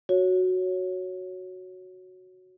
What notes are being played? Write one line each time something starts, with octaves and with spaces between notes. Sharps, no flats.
F#4 C#5